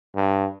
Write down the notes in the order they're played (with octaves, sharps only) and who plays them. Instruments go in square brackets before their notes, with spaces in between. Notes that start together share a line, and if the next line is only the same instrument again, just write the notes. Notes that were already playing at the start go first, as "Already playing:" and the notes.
[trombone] G2